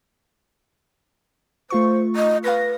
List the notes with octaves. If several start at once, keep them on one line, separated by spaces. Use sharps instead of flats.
A3 F4 C5 C#6
D#5
B4 F5 A#6